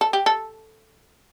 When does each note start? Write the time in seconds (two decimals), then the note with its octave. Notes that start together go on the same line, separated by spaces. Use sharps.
0.01 A4
0.13 G4
0.26 A4